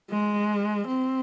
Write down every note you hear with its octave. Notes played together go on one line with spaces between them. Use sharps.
G#3
C4